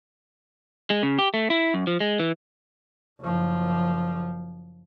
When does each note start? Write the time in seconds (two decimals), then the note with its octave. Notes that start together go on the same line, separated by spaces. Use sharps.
0.90 G#3
1.03 C#3
1.19 G4
1.34 A3
1.50 E4
1.74 F#2
1.87 F3
2.00 G#3
2.19 E3
3.20 F#1 F3